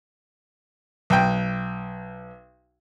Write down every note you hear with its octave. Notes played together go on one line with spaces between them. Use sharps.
B1 G5